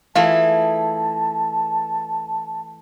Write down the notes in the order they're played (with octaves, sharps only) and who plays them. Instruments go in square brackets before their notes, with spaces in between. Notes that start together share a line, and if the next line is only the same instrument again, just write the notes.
[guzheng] E3 A3 G#4 [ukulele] F4 F5 [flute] A5